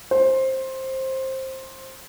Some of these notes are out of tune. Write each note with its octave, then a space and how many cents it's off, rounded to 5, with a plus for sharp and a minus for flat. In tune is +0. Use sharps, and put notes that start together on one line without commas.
C5 +15